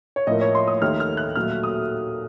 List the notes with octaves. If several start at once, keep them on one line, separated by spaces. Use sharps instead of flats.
C#5
A2 F3 A#3 D#5
C#5
C6
D#6
D#2 D#3 A3 F6
F6
F#6
A#2 F#3 A3 F6
D#6